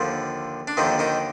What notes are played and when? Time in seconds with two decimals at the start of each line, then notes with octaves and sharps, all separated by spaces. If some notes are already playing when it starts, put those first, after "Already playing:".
Already playing: D#2 D3 F3
0.68 D4
0.77 D#2 D3 D#3 F3 D#4
0.99 D#3 D#4